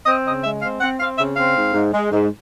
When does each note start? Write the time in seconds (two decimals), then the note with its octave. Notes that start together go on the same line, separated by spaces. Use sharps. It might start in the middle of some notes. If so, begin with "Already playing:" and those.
0.06 C4 D#5
0.24 C#3 D#5
0.44 G#3 E5
0.62 C4 F5
0.81 C4 F#5
0.99 C4 F5
1.18 C#3 E5
1.36 C4 F5
1.55 G#2
1.74 G#2
1.93 G#3
2.11 G#2